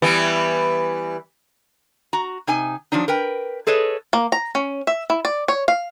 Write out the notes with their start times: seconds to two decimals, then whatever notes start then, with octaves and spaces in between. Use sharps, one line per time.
0.02 E3 G3 B3
2.13 F#4 A#5
2.47 C3 D#4 G#5
2.92 F3 F#3 D4 D#4
3.08 A#4 B4 G5
3.67 G#4 A4 B4 C#5 D#5
4.13 A#3
4.32 A#5
4.55 C#4
4.87 E5
5.10 E4
5.25 D5
5.48 C#5
5.68 F5